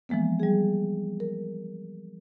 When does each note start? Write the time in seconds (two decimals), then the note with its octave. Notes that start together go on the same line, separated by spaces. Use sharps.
0.09 E3 F3 G#3 A#3 B3
0.40 G3 G#4
1.20 A#4